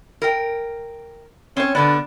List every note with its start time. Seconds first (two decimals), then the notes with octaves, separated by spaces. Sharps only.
0.22 A#4 G5
1.57 C4 C#4 C#5
1.75 B2 D3 B3 D4